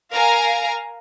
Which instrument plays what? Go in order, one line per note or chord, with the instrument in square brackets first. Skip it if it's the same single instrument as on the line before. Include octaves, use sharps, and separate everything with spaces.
[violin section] A#4 F5 G#5 A#5